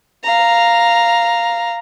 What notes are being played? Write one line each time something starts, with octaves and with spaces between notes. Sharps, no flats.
F5 A#5